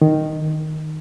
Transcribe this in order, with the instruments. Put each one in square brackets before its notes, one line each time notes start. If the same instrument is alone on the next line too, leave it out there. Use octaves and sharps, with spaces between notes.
[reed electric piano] D#3